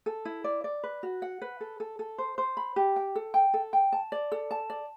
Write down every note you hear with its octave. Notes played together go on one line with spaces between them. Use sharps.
A4
E4
D5
D5
B4
F#4
F#5
B4
A4
A4
A4
C5
C5
B5
G4
G5
A4
G5
A4
G5
A5
D5
A4
A5
D5